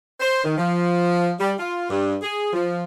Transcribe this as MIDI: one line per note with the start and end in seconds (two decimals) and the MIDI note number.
0.20 0.41 72
0.44 0.58 51
0.58 1.33 53
1.40 1.52 55
1.58 1.86 65
1.90 2.16 43
2.22 2.51 68
2.53 2.84 53